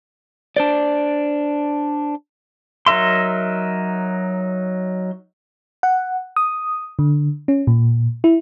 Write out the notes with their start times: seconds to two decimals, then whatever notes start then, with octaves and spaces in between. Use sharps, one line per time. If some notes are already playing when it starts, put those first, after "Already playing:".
0.56 D4 C5 D5
2.87 F#3 D#4 A#4 E5 C6
5.83 F#5
6.36 D#6
6.99 D3
7.48 C#4
7.67 A#2
8.24 E4